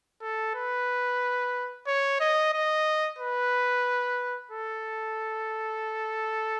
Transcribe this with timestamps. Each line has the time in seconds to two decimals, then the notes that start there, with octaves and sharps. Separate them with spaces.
0.21 A4
0.55 B4
1.87 C#5
2.20 D#5
2.53 D#5
3.19 B4
4.51 A4